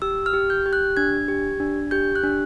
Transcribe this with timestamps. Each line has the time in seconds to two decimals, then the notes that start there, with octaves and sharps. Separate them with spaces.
0.02 G4 E6
0.26 F6
0.33 G4
0.50 G6
0.66 G4
0.73 F#6
0.97 D4 G#6
1.28 G4
1.60 D4
1.91 G4 G6
2.16 F#6
2.23 D4